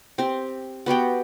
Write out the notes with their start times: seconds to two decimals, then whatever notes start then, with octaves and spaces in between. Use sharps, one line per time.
0.18 C4 G4
0.86 B3 F#4 G4 G5